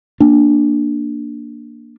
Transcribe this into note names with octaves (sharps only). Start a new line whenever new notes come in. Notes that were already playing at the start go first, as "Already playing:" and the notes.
A#3 D4